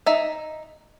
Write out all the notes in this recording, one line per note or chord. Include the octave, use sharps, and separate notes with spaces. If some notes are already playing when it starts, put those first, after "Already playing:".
D#4 E5